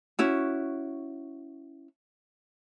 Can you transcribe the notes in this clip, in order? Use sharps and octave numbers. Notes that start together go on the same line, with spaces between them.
C#4 E4 F#4